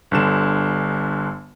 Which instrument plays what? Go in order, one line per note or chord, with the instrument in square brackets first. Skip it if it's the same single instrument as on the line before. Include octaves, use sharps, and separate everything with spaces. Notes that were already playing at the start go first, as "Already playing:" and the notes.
[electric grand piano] G1 D3 E7